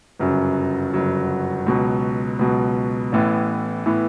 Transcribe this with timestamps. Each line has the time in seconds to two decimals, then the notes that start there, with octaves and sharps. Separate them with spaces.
0.19 G1 F#2 C#3 F#3
0.93 G1 F#2 C#3 F#3
1.66 C#2 B2 F#3
2.39 C#2 B2 F#3
3.12 A1 A2 E3 B3
3.86 A2 E3 B3